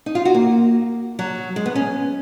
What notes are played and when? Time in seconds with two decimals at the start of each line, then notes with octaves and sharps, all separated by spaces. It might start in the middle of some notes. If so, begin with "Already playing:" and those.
0.06 D#4
0.15 F4
0.25 F#4
0.34 A#3
1.19 F#3
1.56 G#3
1.66 B3
1.75 C#4